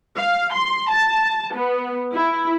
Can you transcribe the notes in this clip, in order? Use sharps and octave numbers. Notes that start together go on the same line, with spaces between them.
F5
C6
A5
B3
E4